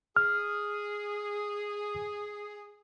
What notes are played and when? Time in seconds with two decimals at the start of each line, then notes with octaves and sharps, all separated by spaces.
0.16 G#4 F6